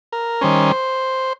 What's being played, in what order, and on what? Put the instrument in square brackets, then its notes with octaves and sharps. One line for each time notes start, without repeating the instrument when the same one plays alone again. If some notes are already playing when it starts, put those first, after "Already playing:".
[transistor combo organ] A#4
D#3 G3 C#4 C5